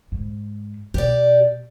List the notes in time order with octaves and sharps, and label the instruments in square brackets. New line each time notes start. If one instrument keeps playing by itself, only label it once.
[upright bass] G#2
[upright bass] B2 [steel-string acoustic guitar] G4 D5